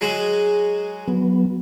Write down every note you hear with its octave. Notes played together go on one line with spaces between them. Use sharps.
F#3 G#3 F#4
F#3 B3